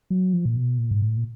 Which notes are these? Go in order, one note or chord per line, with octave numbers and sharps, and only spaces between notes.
F#3
F3
A#2
B2
A#2
G#2
A2
A#2